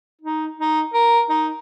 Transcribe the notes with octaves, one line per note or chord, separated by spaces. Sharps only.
D#4
D#4
A#4
D#4